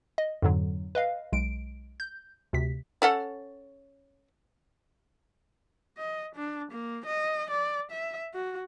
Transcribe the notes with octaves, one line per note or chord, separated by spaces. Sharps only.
D#5
F2 G#2 D3 F#3
B4 D#5 F5
B1 G#3 D7
G6
D2 C3 B6
C#4 A4 F#5
D#5
D4
A#3
D#5
D5
E5
F#4